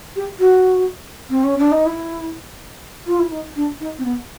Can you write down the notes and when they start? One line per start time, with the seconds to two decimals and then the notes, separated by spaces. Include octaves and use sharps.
0.16 G4
0.39 F#4
1.29 C4
1.43 C#4
1.58 D4
1.71 D#4
1.85 E4
3.06 F4
3.19 E4
3.31 D#4
3.56 D4
3.80 D#4
3.98 C4
4.04 B3